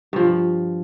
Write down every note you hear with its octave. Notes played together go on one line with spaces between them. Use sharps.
G2 F3